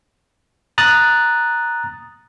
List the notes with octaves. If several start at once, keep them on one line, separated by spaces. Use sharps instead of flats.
A#5 D#6 F#6 A6